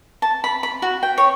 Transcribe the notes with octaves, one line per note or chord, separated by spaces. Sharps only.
A5
B5
B5
F#4
G5
C#5